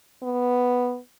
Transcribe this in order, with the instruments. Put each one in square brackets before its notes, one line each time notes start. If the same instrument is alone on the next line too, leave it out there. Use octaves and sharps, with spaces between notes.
[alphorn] B3